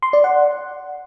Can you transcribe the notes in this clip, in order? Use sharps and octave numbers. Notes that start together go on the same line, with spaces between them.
C6
D5
F#5